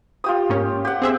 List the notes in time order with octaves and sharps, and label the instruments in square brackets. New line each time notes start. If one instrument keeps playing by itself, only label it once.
[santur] F4 G4 D#6
[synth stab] G#2 A#3 C#4
[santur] G4 F#5
[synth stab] C4 G#4 E5